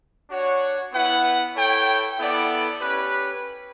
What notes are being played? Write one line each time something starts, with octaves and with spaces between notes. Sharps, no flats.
D4 F#4 C#5 F#5
B3 E4 B4 F#5
E4 A4 C#5 G5
B3 E4 A4 D5 F#5
C#4 G4 B4